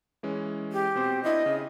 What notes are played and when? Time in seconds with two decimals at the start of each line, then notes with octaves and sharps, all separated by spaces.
0.23 E3 G#3 C#4
0.73 G4
0.95 B2 C4 C5
1.23 C4 D4 E4 D#5
1.46 C#3